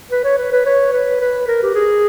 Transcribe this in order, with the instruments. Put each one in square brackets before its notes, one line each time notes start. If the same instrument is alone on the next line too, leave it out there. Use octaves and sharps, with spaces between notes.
[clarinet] B4
C#5
B4
B4
C#5
B4
B4
A#4
G4
G#4